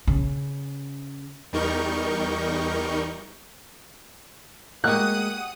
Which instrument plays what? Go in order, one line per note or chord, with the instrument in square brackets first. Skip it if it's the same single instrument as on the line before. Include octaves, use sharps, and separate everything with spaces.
[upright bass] C#3
[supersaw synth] E2 G3 D#4 A#4 C#6 G6
[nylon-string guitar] G#3 A#3 [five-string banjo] D#4 F#4 G4 [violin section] F#5 D#6 [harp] F#6